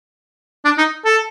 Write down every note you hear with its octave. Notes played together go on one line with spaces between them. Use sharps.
D4
D#4
A4